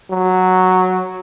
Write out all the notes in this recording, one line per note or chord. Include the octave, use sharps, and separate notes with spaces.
F#3